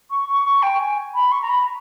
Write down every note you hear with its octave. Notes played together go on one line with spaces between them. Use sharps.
C#6
C#6
C#6
G5
G#5
B5
C#6
A#5
B5